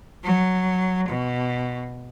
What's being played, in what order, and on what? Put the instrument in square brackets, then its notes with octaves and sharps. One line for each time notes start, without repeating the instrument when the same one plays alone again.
[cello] F#3
B2